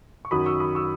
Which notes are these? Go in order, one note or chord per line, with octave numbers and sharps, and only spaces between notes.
C#6
F#2 D#3 F#3 B5 D#6
C#6 E6
B5 D#6
C#6 E6